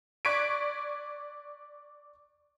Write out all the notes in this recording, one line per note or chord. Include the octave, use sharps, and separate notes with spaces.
D5 C#6 F#6 G#6 B6 D7